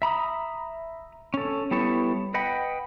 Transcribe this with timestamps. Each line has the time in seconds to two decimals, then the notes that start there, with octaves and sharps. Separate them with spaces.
0.02 E5 A#5 B5 D#6
1.34 C#4 A4
1.71 G3 B3 E4 A4 C#5
2.34 B4 D#5 F#5 G5 B5